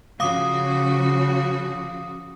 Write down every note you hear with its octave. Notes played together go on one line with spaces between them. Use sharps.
C#3 F3 F#4 F5 D6 D#6